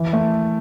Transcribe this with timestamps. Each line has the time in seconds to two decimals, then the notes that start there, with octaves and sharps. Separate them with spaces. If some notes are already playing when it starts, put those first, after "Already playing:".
Already playing: E3
0.13 A3